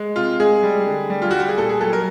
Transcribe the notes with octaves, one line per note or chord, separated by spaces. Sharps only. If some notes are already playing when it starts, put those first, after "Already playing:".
Already playing: G#3
C3 F4
G#3 G#4
G3
D3
G3
F4
G3 F#4
G4
G#4
A#2 A4
G#4
F#3 A4
A#4